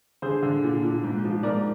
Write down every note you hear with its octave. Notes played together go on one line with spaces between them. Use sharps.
D3 G#4 C5
D3
A#2
A#2
G#2
F3
G#2 A#4 D5